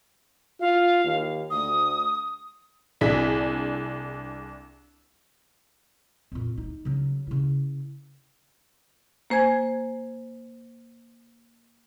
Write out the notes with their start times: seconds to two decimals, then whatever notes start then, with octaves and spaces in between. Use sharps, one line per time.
0.60 F4 F5
1.04 D#2
1.50 D2 D#6
3.01 C2 D4 E4 G#4 B6
6.32 F2 A#2
6.58 D#4
6.85 C#3 F#3
7.27 C#3 E4
9.30 A#3 C5 G#5 G#6